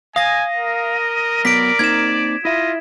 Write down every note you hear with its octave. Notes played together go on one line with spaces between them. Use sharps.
D#5 F5 G#5 D#6 A#6
A#4
F#3 B3 D5 B6 D7
A#3 C4 D#4 G#6 E7
E4 F4 D#5 E5